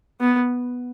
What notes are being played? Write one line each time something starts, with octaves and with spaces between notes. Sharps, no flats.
B3